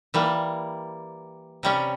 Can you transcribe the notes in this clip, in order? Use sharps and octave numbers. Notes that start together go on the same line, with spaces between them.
E3 G3 A#3
C3 G3 C#4